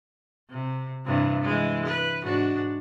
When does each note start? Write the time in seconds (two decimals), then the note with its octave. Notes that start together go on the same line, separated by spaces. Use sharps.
0.49 C3
1.06 G2 C3 E3
1.42 E3 G#3
1.85 B4
2.23 G#2 D4 F#4